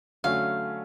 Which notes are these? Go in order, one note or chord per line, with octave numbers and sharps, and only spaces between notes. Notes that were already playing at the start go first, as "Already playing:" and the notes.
D3 F#3 A3 C#4 F5